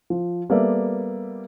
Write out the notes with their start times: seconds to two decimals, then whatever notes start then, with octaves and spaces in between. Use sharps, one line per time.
0.10 F3
0.50 G3 A#3 B3 A4 D5 E5